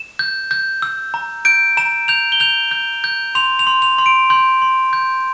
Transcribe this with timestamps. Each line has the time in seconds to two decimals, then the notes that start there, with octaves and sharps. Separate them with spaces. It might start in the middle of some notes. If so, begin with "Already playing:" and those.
Already playing: E7
0.19 G6
0.51 G6
0.82 E6
1.14 A#5
1.45 G6 D7
1.77 A#5 E7
2.08 G6 F7
2.32 G7
2.40 G6 F7
2.71 G6
3.04 G6
3.35 C6 F7
3.59 F7
3.67 C6
3.82 F7
3.98 C6
4.06 D7
4.30 C6 G6
4.62 C6
4.93 G6